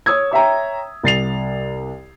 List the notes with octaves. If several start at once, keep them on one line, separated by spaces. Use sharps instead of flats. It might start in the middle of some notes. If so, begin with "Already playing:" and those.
C#5 D#6 E6 G#6
C#5 E5 G5 A#5
C2 A6 C7 F7